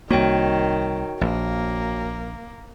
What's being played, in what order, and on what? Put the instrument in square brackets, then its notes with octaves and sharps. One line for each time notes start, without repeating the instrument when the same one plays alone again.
[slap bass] C2 A#3 [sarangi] D#3 [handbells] F#4 C#5 G5
[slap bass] A#1 [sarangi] A#3